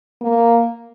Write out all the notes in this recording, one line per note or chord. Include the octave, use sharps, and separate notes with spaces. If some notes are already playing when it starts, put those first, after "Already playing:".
A#3